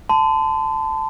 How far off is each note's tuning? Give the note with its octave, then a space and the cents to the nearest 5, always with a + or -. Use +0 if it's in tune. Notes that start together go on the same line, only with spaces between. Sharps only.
A5 +0 C6 -40